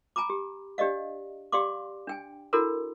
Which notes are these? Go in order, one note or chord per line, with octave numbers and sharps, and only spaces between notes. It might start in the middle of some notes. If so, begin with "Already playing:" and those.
G#5 A#5 B5 D6
G4
D4 G4 D5 D#5 F5
G4 D5 F5 C6 D6
D4 G5 G#5
D4 E4 F#4 A4 A#4 B5